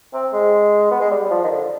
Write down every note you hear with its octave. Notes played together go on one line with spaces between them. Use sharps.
C4
G#3
B3
G#3
G3
G3
F3
D#3
D3